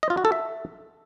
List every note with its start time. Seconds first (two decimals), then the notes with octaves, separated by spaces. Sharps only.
0.03 D#5
0.10 F4
0.17 F#4
0.25 A4
0.32 E5